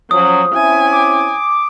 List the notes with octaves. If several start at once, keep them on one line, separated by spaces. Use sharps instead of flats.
F3 F#3 C#4 D#6
C4 C#4 E4 G#5
D6